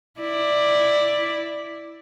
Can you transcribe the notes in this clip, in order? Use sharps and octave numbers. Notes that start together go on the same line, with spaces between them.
E4 D5